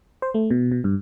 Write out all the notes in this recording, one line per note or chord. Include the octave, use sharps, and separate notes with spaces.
C5
A3
B2
B2
G2